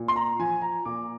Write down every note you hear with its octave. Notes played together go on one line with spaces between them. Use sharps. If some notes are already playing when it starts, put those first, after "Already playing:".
Already playing: A#2
C6
A#5
F3 G#5
A#5
A#2 D6